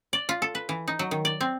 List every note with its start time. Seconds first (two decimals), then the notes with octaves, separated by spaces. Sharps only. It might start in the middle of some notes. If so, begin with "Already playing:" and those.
0.13 D5
0.29 F4
0.42 A4
0.55 B4
0.69 E3
0.88 D#4
0.99 F#3
1.11 D#3
1.25 D5
1.41 C4